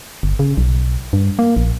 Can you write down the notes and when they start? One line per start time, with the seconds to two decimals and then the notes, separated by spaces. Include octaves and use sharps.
0.23 G1
0.39 C#3
0.57 B1
1.13 G2
1.39 A#3
1.57 A#1